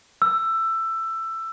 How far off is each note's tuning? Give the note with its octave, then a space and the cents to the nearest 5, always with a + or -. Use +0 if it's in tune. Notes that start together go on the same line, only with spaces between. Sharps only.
E6 +15